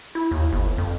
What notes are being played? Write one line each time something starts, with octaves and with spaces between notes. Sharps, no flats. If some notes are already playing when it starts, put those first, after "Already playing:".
E4
D#2
G1
F2